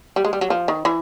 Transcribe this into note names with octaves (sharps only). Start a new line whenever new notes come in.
G3
G#3
G3
F#3
F3
D#3
E3